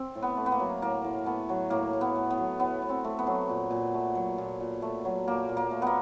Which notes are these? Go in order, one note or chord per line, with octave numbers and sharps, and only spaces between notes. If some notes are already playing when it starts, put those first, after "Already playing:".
Already playing: C4
A2
B3
A3
B3
A#3
F#3
A2 A#3
A2
A3 B3
F#3
A2 A#3
A2
B3
A3
B3
F#3
A2 B3
A2
C4
A3
B3
F#3
A#2
A#2
A3
F#3
A#2
A#2
A3
F#3
A#2 A#3
A#2
A#3
A3
A#3 B3